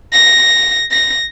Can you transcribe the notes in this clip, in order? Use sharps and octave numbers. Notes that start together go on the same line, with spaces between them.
A#6
A#6